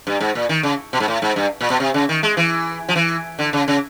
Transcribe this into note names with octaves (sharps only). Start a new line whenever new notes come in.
G2
G#2
A#2
D#3
C#3
B2
G#2
A2
G#2
G2
A#2
B2
C3
C#3
D#3
G#3
E3
F3
E3
D3
C#3
C#3